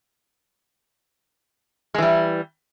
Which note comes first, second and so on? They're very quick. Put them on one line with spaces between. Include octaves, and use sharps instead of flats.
G#3 E3 G3